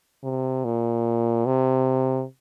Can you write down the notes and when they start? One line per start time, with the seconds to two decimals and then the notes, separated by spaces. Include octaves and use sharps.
0.24 C3
0.65 A#2
1.46 C3